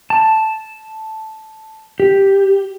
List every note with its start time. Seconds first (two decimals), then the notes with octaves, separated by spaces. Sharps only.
0.10 A5
2.00 G4